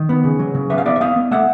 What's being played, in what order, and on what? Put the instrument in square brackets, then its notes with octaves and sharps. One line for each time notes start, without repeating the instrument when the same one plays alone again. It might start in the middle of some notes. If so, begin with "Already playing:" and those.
Already playing: [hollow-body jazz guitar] D#3
B3
C#3
F#3
C#3
B3 E5
F5
B3 D5 E5
E5
B3 D#5 F5
B3
A3 E5 F#5